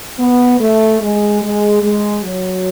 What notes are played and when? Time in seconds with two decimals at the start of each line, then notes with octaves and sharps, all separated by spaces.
0.19 B3
0.60 A3
1.01 G#3
1.42 G#3
1.82 G#3
2.23 F#3